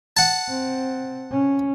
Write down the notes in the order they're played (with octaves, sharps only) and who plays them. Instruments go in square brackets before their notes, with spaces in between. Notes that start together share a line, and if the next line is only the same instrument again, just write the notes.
[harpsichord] F#5 A5
[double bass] C4
C#4